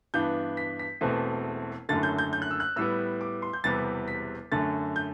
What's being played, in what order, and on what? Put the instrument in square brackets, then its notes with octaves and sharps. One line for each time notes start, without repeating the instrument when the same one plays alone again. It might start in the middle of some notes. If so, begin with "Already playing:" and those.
[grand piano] G2 E3 B3 D4 G6
B6
B6
E1 E2 B2 A3 C4
F#1 F#2 D3 A3 A6
G6
G6
G6
F#6
E6
F#6
A2 G3 B3 E6
D6
C6
G6
E1 E2 C3 G3 B3 A6
B6
F#2 D3 A3 A6
G6